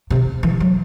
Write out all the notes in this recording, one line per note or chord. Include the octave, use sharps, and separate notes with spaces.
C3
E3
F#3